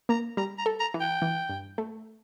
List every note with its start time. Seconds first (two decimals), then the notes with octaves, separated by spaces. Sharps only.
0.09 A#3 A#5
0.37 G3 A#5
0.58 A#5
0.66 A4
0.80 A#5
0.94 E3
1.00 G5
1.22 E3
1.49 G2
1.78 A3